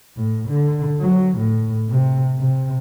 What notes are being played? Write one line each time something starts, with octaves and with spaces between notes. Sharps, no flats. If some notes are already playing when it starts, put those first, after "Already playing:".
A2
D3
F#3
A2
C3
C3